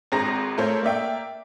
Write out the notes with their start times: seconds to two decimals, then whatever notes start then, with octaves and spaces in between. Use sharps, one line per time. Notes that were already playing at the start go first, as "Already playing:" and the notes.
0.12 G#1 C4 G#4 A#5 A#6
0.58 A3 A4 A#4 C5 C#5
0.83 A#3 D5 E5 G5